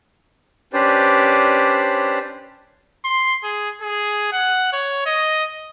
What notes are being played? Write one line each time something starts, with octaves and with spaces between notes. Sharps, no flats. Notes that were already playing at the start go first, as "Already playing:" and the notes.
C#4 D4 G4 B4 C5 D5
C6
G#4
G#4
F#5
C#5
D#5